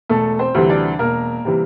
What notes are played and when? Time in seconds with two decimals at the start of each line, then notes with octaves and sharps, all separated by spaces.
0.09 E1 A3 A4
0.39 C4 C5
0.54 D2 C3 E3 G3
0.70 D4 D5
0.99 E1 A#3 A#4
1.45 C3 E3 G3